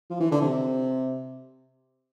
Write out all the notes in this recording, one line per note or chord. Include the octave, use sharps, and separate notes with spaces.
F3
E3
D3
C3